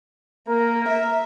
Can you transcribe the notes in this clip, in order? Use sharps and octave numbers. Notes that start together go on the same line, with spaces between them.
A#3 A#4
E5